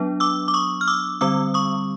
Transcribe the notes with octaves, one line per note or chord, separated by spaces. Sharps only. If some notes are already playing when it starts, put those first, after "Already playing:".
Already playing: F#3 B3 D4
D6 E6
D6
C#6 D#6
F6
D6 E6
D3 G3 C4 D6 E6
C#6 D#6